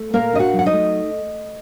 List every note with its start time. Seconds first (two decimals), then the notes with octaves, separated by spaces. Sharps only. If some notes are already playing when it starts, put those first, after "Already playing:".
Already playing: A3
0.13 A#2 A#3 A#4
0.33 D4 D#5
0.39 F#4 F#5
0.53 F#3
0.59 F#5
0.66 D#4 D#5
0.73 A3